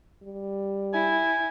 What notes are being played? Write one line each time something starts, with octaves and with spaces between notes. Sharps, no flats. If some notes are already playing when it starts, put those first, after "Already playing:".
G3
E4 G#5